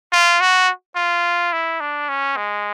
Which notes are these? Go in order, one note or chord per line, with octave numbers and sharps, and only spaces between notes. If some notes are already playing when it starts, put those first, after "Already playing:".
F4
F#4
F4
E4
D4
C#4
G#3